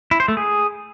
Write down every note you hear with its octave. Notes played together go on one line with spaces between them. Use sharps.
E4
C5
A3
G#4